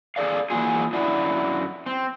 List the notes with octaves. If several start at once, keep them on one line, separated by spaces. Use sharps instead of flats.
G#4 A4 D5 F5
E3 F#3 A#3 F4 G#4
F#2 D3 F#3 E4 D5
C4